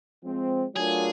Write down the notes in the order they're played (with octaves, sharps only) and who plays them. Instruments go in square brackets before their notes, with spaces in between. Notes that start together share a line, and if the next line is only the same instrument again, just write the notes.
[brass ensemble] F3 G#3 C4
[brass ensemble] F#3 A3 D4 F4 A#4 [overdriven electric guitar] G#4